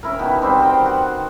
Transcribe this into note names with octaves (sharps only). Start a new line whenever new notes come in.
C#4 E4 A#4
B2 D#3
G3 C4 C5
A#4 C5 G5
F#4